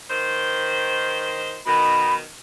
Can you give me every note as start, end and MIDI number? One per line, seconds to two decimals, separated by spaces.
0.10 1.59 51
0.10 1.59 72
1.67 2.23 47
1.67 2.23 51
1.67 2.15 83